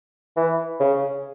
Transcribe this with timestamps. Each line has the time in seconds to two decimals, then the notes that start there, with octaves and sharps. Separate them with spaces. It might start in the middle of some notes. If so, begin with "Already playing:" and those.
0.37 E3
0.80 C#3